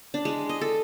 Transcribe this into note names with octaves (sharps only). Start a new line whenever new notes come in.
D4
G#3
D#5
A4